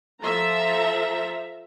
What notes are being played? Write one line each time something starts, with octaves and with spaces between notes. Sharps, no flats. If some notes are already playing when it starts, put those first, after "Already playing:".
F3 A4 E5 A#5